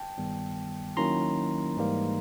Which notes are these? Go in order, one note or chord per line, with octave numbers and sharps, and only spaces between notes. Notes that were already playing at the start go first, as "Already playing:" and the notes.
Already playing: G5 A5
G2 D#3 G3 B3
D#3 F#3 A#3 C#4 E4 A#5 C6
G#2 E3 G3 A#3